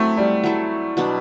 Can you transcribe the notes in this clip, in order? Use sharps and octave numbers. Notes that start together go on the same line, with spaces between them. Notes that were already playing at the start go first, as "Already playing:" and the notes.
Already playing: F#3 A3 C4 E4
G3
F#3 A3 E4 A4
B2 F#3 B3 D4